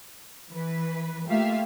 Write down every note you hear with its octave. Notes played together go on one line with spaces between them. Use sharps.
E3 B4
A3 A#3 F4 G4 E5 F5